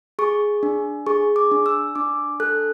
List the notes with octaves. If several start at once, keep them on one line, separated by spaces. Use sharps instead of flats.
G#4 C#6
D4
G#4 C#6
D6
D4
E6
D4 D6
A4 F#6